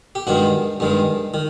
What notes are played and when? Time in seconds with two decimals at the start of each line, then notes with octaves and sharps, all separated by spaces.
0.15 G4
0.27 G2 D#3 G#3 F#4
0.80 G2 D#3 G#3
1.34 D#3